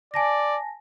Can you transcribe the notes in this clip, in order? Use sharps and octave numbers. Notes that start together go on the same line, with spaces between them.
D5 G#5 A5 A#6